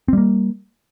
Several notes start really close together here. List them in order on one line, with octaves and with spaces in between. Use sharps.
C4 G3 A#3